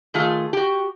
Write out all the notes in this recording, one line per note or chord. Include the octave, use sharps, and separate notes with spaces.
D#3 A3 F4 G#4
F#4 G4